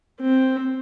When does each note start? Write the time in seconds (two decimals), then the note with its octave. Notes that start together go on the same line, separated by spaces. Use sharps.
0.20 C4